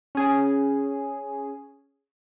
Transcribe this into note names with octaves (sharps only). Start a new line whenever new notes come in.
C#4 G#4